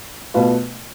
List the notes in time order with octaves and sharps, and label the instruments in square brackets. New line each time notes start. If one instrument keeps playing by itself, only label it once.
[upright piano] B2 A3 F4 B4